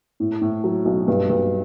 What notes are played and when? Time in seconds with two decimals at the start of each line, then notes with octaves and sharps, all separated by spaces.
0.20 A2
0.41 A2
0.64 F#3
0.85 B1
1.08 G2
1.29 G2